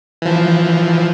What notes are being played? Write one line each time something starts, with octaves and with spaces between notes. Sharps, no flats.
E3 F3